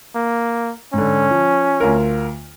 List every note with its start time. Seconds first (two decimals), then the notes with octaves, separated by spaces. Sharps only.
0.15 A#3
0.94 G#2 D3 C#4
1.31 F3
1.80 D2 F4 A#4